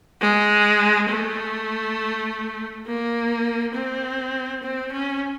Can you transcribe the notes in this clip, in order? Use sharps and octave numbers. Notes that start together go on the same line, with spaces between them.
G#3
A3
A#3
C4
C4
C#4